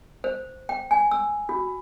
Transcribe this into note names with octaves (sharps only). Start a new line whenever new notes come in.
C5
G5
G#5
E6
F#4